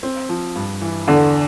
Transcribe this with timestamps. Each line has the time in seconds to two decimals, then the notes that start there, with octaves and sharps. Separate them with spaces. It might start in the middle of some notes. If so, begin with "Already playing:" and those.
0.03 C4
0.29 F3
0.56 G2
0.82 E3
1.08 E2 D3